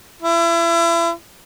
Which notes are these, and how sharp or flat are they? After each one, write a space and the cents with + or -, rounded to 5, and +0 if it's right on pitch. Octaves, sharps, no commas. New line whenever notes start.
E4 +35